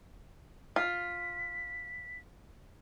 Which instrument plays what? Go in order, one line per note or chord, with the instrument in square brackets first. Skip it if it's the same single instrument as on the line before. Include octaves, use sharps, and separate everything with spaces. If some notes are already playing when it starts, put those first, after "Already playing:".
[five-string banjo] F4 [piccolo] B6